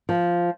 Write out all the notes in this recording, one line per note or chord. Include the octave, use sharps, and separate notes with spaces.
F3